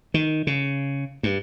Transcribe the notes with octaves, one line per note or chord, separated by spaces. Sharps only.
D#3
C#3
G2